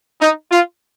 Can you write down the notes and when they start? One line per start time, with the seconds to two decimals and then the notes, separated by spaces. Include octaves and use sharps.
0.20 D#4
0.50 F4